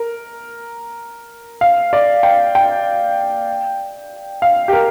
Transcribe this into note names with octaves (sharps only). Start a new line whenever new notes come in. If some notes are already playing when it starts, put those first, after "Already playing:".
Already playing: A#4
F5
D5
G5
G5
F5
G4
A#4